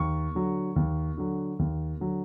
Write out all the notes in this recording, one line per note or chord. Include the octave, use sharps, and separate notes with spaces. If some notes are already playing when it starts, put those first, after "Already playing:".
Already playing: D#2 C#6
D3 F#3
D#2
D3 F#3
D#2
D3 F#3